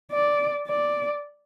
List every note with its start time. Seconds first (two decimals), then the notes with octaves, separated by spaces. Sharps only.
0.12 D5
0.68 D5